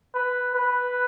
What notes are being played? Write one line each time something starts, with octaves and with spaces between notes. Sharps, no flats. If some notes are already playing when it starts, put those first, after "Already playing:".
B4
B4